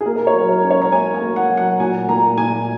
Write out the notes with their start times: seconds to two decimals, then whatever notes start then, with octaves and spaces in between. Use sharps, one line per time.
0.01 G#4
0.06 A#3 A#4
0.16 A#4
0.27 C#5
0.34 F#3
0.49 A#4
0.64 C#4
0.71 C#5
0.82 A#5
0.92 A#3 G#5
1.14 G#5
1.21 A#3
1.36 F#5
1.50 F#3
1.57 F#5
1.80 A#2 G#5
2.08 A#2 A#5
2.38 A#2 G#5